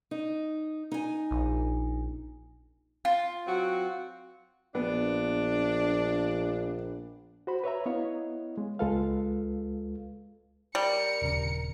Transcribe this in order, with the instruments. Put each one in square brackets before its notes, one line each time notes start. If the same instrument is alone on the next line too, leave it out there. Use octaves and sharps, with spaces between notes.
[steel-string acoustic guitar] D#4
D#4 G#5
[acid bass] A#1
[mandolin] F4
[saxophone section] F#3 C4 F#4
[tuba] A#1 [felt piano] B3 [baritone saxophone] D4
[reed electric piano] F#4 C5 B5
B4 C#5 E5 A#5
B3 E4 C#5 D#5 F5
G#3
C#2 G#3 F4 A4 B4 F5
[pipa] G3 [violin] A#4 C#7
[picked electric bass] D#1 C#3